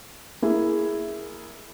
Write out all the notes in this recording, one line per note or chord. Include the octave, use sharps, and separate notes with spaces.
A#3 E4 G#4